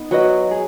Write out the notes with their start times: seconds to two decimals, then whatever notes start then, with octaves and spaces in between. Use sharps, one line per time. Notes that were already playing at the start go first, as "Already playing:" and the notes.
Already playing: B3 D#4
0.11 F#3 F#4 B4 D#5
0.51 G#4